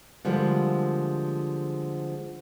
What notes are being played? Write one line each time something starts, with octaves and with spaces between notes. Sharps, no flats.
D3 F3 G3 G#3 A#3